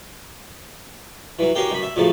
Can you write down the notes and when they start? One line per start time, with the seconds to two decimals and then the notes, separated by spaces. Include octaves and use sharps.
1.39 E3 F#3
1.55 C#4 F#4 G4 A#4 F5 G5
1.71 F#2 B5
1.83 E5
1.96 F#2 A2 C#3 F3 F#3